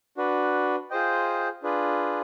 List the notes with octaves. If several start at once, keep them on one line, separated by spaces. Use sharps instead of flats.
D4 F#4 B4
F4 G#4 C5 D#5 G5
D4 F4 G#4 B4